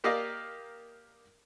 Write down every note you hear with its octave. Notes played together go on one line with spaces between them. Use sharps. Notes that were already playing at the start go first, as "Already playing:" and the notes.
A#3 G4 A#4 D5 D#5 F5